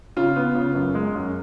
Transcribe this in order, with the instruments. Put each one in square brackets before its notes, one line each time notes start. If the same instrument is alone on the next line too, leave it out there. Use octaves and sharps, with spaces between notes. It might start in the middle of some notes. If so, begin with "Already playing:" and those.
[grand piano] C#3 [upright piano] F4
[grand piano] B3
C#3
F#2
G#3
F#2